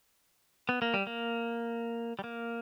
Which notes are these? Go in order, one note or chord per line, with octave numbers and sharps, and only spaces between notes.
B3
A#3
G3
A#3
G3
A#3